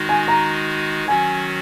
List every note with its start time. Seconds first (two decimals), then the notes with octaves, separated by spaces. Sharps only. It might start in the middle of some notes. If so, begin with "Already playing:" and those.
Already playing: D#3 G#3 D#4 F#4
0.09 G#5
0.28 A#5
1.08 D#3 F#3 C#4 F#4 G#5